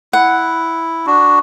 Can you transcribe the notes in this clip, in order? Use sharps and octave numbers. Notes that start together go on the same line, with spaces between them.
E4 F#5
D4 F#4